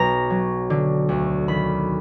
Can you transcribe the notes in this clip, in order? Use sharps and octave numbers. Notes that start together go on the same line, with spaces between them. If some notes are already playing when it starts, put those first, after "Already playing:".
Already playing: B1 A#5
F#3
D3
D2
D#3 B5